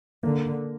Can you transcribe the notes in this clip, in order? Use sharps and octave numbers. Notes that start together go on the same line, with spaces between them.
D3 A#3